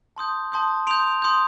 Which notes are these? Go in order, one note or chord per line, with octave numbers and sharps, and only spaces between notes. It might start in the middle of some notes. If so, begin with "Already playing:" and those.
A5 C6 D#6 G6
A5 C6 D#6 G6
C6 D#6 G6 D7 F7
C6 D#6 G6